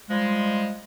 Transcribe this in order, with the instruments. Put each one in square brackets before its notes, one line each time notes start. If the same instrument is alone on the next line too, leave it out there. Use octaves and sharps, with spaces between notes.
[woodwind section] F3 G3 G#3